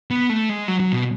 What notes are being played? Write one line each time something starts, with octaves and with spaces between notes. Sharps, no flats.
B3
A3
G#3
F#3
F#3
B2